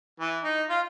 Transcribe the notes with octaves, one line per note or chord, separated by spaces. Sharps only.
E3
D#4
F4